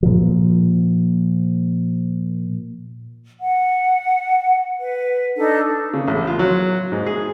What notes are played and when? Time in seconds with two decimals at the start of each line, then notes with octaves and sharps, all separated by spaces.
0.03 A#2 F3
3.39 F#5
4.80 B4
5.36 D4 D#4 A4
5.94 C#3
6.08 A1
6.27 F4
6.39 F#3
6.92 G#2
7.06 G#4